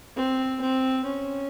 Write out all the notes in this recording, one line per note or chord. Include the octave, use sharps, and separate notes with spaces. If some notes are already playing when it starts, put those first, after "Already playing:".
C4
C4
C#4